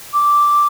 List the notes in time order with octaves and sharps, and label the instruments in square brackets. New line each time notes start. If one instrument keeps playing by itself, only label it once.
[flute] D6